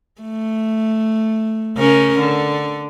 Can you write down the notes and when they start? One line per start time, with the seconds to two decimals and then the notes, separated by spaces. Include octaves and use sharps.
0.21 A3
1.77 C#3 C#4 A#4
2.19 D3